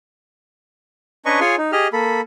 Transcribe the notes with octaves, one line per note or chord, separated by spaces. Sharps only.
C#4 D4 B4 D#5 A#5 C#6
F4 G#4 C#5 G#5 C6
D#4
G4 G#4 D#5 F6
A#3 A4 B5